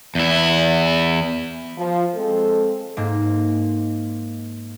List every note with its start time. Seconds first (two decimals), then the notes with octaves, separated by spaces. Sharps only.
0.15 E2 E4
1.77 F3
2.15 G#3 C4 A4
2.97 G#2 A#3